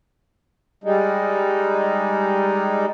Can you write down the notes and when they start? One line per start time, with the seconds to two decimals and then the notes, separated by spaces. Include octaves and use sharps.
0.84 G3 G#3 D#4